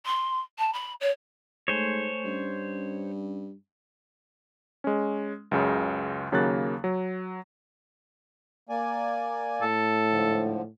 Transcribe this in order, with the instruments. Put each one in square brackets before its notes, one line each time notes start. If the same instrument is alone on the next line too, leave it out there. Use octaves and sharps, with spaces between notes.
[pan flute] C6
A5
B5
C#5
[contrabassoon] G#2 [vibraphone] A3 A4 G#5 [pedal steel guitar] C5 C#5
[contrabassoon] G2 [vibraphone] C#4
[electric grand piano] G#3 C#4
C#2 F#2 C#3
D#2 C#3 F#3 A#3 F#6 A6
F#3
[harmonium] A#3 D5 G#5
[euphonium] A2 [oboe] A4
[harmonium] G#2 D3 F3